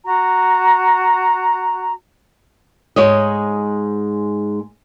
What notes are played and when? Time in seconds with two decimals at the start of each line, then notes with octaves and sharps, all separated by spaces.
0.03 F#4 A#5
2.96 G#2 G#3 C#5 D#5